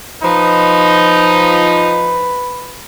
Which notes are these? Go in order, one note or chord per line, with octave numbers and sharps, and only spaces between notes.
F3 D#4 B4